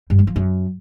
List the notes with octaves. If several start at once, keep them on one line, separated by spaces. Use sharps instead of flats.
G2
G3
F3
F#2